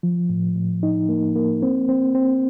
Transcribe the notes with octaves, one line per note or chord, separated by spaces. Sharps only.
F3
A2
A2
D#4
A#3
A#3
C4
C4
C4